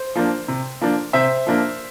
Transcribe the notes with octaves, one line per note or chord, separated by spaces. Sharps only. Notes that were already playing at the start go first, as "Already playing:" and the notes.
Already playing: C5
F3 A#3 D4
C3
F3 A#3 D4
C3 C5 E5
F3 A#3 D4